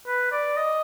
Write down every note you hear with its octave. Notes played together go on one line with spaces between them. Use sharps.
B4
D5
D#5